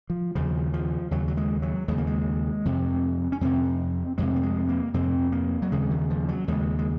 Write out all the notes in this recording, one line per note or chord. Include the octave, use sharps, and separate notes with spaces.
F3
D#2 C#3 F3
F3
D#2 C#3 F#3
F#3
G#3
F#3
D#2 C#3 G#3
A#3
G#3
F2 C3
C#4
F2 C3 C4
F2 C3 G#3
A#3
G#3
A#3
F2 C3 C4
A#3
F#3
D#2 C#3 G#3
D#3
F3
F#3
D#2 C#3 G#3
G#3